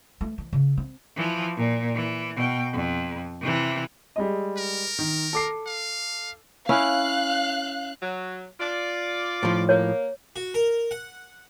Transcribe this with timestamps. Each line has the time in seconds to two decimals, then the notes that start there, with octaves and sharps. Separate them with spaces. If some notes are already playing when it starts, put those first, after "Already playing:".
0.21 A3
0.38 E3
0.53 C#3
0.77 C4
1.16 E3 F3
1.57 A#2
1.95 E3
2.36 B2 G5
2.73 F2
3.41 C3 E3
4.16 G3 G#3 D#5
4.57 A#4
4.99 D#3
5.33 A4 D6 C7
5.67 F5
6.69 C#4 E4 F5 F#6
8.01 F#3
8.59 F4 D5
9.43 A2 F3
9.69 A#3 C#5
10.36 F#4
10.54 A#4
10.91 F#5